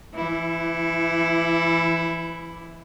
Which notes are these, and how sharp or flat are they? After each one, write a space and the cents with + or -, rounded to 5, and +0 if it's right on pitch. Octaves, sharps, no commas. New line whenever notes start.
E3 +30 E4 +0